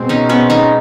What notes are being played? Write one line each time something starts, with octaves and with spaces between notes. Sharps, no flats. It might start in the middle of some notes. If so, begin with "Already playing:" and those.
Already playing: B2 G#3 C4
C#4 D#4
B3 C#4
C#4 D#4